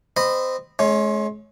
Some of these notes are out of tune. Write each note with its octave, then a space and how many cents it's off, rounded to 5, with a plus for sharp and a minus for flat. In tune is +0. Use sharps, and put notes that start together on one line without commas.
C4 -15 D#5 -20 B5 +0
G#3 +35 C#4 +0